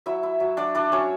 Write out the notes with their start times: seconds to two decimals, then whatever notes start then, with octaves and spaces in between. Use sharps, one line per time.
0.06 F#3 E4 E5
0.23 E4
0.40 F#3
0.57 F#3 D4 D5
0.75 D4 E4 D5
0.92 F#3 C#4 C#5